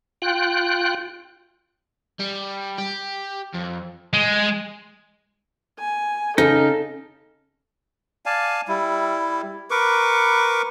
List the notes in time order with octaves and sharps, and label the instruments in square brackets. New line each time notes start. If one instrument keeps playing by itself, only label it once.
[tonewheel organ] F4 G5 F#6
[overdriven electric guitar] G3
G4
F2
[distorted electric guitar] G#3
[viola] G#5
[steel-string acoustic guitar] C#3 [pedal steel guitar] D#4 [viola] A4
[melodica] D5 F5 G#5 A5
G3 E4
A#4 B4 C#6 D6